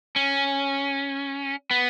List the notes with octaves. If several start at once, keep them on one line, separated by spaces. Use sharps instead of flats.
C#4
B3